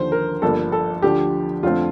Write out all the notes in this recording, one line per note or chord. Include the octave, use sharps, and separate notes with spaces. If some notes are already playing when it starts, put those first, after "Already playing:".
Already playing: D#2 D3 F3 C5
A#4
G1 G2 F3 A#3 A4
A4
D2 D3 F3 G4
F2 D3 A3 C4 F4